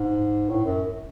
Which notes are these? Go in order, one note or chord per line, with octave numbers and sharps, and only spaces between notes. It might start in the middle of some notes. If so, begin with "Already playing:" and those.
Already playing: G#2
A2
F#2